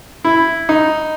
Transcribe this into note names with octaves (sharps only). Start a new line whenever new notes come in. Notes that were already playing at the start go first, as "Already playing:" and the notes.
E4
D#4